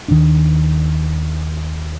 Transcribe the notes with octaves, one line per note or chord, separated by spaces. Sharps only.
D#2 D#3 G3 D4